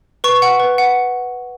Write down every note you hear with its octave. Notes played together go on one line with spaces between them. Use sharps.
B4 C#6
F#5
B4
F#5